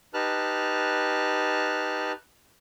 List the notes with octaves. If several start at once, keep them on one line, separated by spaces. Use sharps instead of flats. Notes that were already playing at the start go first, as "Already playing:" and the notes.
D#4 G4 B4 A5 F6 F#6